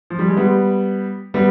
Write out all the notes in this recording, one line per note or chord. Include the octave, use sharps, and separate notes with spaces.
F3
G3
G#3
G3 B3
G3 B3